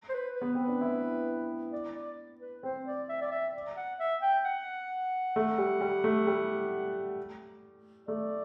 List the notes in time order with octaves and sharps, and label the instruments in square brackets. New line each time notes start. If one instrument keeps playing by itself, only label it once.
[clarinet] C5
B4
B4
[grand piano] B3
[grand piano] C4 [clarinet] B4
[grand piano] D4
E4
[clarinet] D5
D5
B4
[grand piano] C4 [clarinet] C5
[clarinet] D5
E5
D5
E5
D5
F#5
E5
G5
F#5
[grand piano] A3
G3
G3
A3
G3
[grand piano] A3 [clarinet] D5